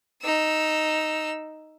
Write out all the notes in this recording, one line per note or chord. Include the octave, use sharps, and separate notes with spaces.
D#4 E6